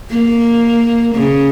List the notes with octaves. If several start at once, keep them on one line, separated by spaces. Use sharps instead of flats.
A#3
C#3